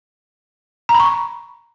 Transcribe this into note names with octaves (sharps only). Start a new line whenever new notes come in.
A#5
B5
C#6